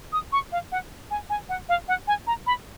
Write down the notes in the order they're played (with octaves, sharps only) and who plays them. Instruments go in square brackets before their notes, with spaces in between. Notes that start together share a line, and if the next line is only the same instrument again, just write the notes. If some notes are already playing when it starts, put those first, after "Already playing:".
[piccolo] D#6
C#6
F5
F#5
G#5
G#5
F#5
F5
F#5
G#5
A#5
B5